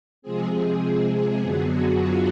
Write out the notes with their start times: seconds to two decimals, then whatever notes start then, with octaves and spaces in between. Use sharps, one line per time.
0.22 C3 F3 G#3 C4 G#4
1.38 F#2 D3 F#3 B3 G#4
1.67 F#4
1.97 F4